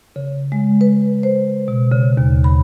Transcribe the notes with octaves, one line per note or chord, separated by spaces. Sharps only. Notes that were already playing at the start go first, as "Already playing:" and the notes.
C#3
G#3
B4
C5
B2
C#3
D#2
B5